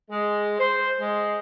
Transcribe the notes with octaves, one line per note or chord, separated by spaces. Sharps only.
G#3
C5
G#3